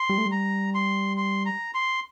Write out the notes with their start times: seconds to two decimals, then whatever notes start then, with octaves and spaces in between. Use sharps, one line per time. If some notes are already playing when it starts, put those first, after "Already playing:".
Already playing: C6
0.09 G3
0.18 A3
0.26 G3
0.31 A#5
0.74 C6
1.17 C6
1.46 A#5
1.74 C6